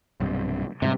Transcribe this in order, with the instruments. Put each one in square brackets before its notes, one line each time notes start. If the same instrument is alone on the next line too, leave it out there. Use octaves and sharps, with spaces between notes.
[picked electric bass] B1 G2 C3
[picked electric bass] G#2 E3 G3 [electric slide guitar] C3